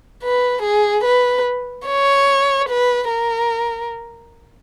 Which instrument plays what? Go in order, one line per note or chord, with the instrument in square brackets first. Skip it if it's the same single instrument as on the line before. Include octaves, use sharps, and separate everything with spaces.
[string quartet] B4
G#4
B4
C#5
B4
A#4